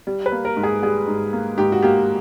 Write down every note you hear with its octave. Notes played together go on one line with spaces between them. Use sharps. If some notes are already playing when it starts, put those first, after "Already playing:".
G3
B4
A#3
A#4
G#2
G#4
G3 G#4
G#2
A#3
G#2 G4
F#4
A#3 G4